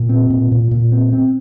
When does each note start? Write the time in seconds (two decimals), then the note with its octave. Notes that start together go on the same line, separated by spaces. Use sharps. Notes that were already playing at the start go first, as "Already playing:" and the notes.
Already playing: A#2
0.09 C4
0.30 A#2
0.52 A#2
0.71 A#2
0.92 C4
1.13 C4